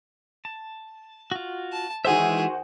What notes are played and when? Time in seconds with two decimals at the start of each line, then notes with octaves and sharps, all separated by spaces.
0.45 A5
1.31 F4 F#4
1.72 A5
2.05 D#3 E3 G#3 F#4 G#4 C5 E5